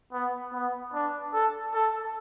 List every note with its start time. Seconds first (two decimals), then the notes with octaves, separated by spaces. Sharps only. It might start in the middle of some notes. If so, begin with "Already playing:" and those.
0.13 B3
0.53 B3
0.94 D4
1.34 A4
1.74 A4